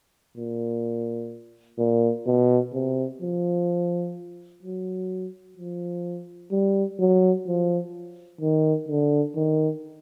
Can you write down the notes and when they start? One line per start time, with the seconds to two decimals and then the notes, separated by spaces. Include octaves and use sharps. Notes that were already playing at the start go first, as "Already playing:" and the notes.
0.37 A#2
1.79 A#2
2.27 B2
2.73 C3
3.22 F3
4.63 F#3
5.58 F3
6.52 G3
7.00 F#3
7.47 F3
8.41 D#3
8.89 D3
9.36 D#3